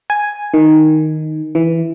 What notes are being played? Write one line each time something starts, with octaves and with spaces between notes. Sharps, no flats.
G#5
D#3
E3